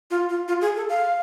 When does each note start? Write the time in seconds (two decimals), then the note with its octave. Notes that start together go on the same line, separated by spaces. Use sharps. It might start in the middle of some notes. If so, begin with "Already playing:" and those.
0.11 F4
0.29 F4
0.48 F4
0.61 G#4
0.76 A4
0.89 F5